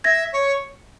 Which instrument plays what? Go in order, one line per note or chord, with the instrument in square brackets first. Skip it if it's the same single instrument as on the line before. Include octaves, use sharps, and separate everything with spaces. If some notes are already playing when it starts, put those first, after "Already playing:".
[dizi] E5 [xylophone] G#6 A#6
[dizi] C#5